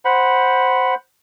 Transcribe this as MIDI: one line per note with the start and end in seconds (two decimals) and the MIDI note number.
0.05 0.94 72
0.05 0.94 78
0.05 0.94 83